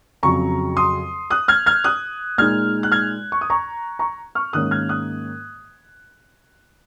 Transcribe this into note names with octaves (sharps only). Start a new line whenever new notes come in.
F2 C#3 F#3 A#5 C#6
C6 D#6
D#6 F#6
F6 G#6
F6 G#6
D#6 F#6
A#2 G#3 D#4 F6 G#6
F#6
F6 G#6
C#6
D#6
A#5 C#6
A#5 C#6
C#6 F6
G#2 D#3 A#3 C#4 D#6 F#6
F6 G#6
D#6 F#6